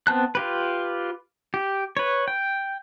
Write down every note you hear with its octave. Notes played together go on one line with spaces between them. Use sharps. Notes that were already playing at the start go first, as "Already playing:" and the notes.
B3 C4 A5 F#6
F4 G4 B4
G4
B4 C#5
G5